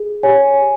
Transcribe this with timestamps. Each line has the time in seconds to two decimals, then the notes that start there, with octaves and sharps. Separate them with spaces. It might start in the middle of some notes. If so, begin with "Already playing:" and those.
Already playing: G#4
0.23 G4 C#5 G#5